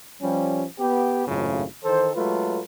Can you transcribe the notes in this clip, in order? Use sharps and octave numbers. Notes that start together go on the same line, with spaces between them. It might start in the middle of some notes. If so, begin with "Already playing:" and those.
F3 G3 C#4
B3 G4
G#1 F#2 A2 C#3 A3 F4
D#3 E3 A4 C5
F#3 G#3 A3 F4 A4 B4